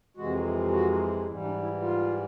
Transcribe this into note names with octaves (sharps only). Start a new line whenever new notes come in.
F2 C3 E3 G#3 F#4
F#4
G#2 E3 G3 E4
D4
E4
F4